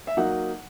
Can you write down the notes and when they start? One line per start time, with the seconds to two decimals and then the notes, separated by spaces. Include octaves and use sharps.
0.07 E5
0.17 F#3 A#3 D#4 F#5